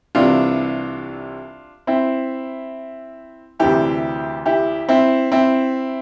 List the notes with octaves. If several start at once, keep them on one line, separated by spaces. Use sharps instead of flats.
C2 C3 E3 D4 F4
C4 E4
D2 C3 E3 E4 G4
E4 G4
C4 E4
C4 E4